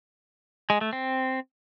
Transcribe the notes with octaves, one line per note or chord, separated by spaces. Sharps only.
G#3
A3
C4